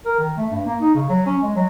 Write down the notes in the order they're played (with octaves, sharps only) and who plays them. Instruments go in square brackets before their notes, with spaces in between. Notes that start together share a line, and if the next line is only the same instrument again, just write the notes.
[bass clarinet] A#4
D#3
A3
G2
A#3
D#4
C#3
F#3
C#4
G#3
F#3